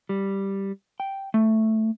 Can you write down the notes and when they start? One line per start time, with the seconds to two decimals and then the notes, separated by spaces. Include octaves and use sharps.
0.09 G3
1.00 G5
1.34 A3